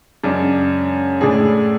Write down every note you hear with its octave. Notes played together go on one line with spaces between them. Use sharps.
F#2 C#3 G#3 D4
A2 G#3 D4 G#4